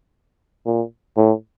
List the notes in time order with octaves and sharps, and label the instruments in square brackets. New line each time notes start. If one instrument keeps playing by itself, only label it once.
[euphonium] A#2
A2